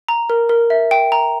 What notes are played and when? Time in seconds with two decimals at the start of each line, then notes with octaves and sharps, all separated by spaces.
0.09 A#5
0.30 A#4
0.49 A#4
0.70 E5
0.91 G5
1.12 A#5